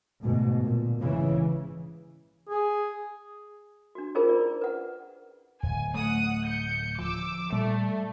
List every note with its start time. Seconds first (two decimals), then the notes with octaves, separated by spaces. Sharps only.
0.22 D2 G#2 B2
0.61 A#2
0.99 A#1 G#2 C#3 E3
2.49 G#4
3.95 D4 F#4
4.15 C#4 D#4 F4 G#4 A#4 C5
4.29 E4 D5
4.61 B4 F#5
5.63 D1 G#5
5.94 A3 F#5 D#6
6.47 G6 C#7
6.99 F3 D6 E6
7.52 A#2 G3 A3